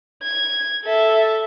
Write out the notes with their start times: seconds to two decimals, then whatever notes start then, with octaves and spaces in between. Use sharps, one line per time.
0.23 G#6
0.84 A4 E5